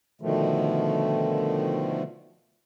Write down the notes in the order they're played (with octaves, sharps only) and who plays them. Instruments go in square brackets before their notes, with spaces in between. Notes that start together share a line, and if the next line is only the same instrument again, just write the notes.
[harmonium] B2 D3 D#3 F3 A3